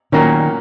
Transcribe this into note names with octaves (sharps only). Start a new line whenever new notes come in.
A#2 D#3 F#3 A#3 C#4